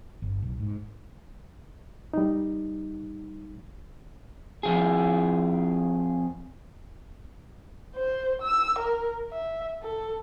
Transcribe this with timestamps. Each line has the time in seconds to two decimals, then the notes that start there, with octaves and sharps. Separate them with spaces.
0.22 G1
0.42 B1
0.60 G#2
2.14 G3 D#4
4.63 F2 C#3 G#4
7.96 C5
8.42 E6
8.79 A#4
9.32 E5
9.83 A4